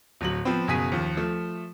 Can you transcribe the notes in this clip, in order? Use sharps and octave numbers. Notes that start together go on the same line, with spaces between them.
D1 F#3 F#7
F3 B3 C4
F#1 B2 G#4 B6 D#7
D#2 F3
F3 A3